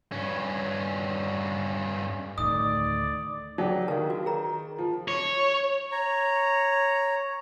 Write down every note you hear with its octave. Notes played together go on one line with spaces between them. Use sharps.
G2 C#4
D2 A2 D#3 A3 D#4 D5 D#6
F#3 D4 D#4 G4 G#4
D#3 F5 A5
F#4
G#4 A#4 A#5
F3
C#5
C#5 A#5